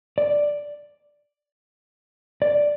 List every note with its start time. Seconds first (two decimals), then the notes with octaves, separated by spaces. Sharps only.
0.18 D5
2.42 D5